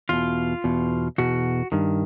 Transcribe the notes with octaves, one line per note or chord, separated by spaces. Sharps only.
E2 B2 F4
E2 B2
E2 B2 F#4
G2 D#3